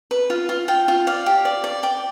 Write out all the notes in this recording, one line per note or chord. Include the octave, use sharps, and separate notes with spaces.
B4
F4
F4
F4 G5
F4
D5 F5
G4
D5
D5
D5 G5